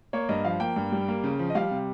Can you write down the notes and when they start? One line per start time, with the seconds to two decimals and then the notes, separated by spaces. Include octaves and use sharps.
0.13 A#3 C#5
0.29 G2 D#5
0.45 F3 F5
0.60 A#3 G5
0.76 G2
0.92 G3
1.08 A#3
1.24 C#3
1.39 F3
1.50 D#5
1.55 G3 F5
1.71 C3